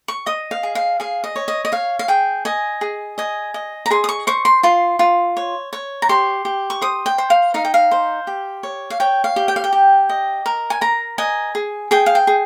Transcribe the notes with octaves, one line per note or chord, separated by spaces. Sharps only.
C#6
D#5 D#6
F5
G#4
F5
G#4 F5
D#5
C#5
D#5
D#5
C#5 F5
F5
G#4 G5
D#5 G#5
G#4
D#5 G#5
D#5
A#5
G#4 C6
D#6
C#6
C5 C#6
C6
F4 C6
F4
C#5
C#5
A#5
G4 C6
G4
C#6
C5 D#6
G5
C5
F5
D#4 F5
G5
F5
C5
G4
C#5
F5
C#5 G5
F5
G4
G5
F5
G5
G4
D#5
A#4
G#5
A#4 A#5
D#5 G#5
G#4
G#4 G5
F5
G5
G#4